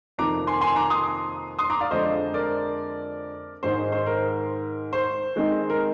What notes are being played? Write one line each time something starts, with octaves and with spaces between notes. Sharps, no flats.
F2 C3 D#3 A#3 A#5 D6
G#5 C6
G#5 C6
A#5 D6
C6 D#6
C6 D#6
A#5 D6
D5 F5
F2 D3 G#3 C5 D#5
A#4 D5
G#2 D#3 G#3 D#4 C5
C5
A#4
C5
D#3 G#3 C4 D#4
A#4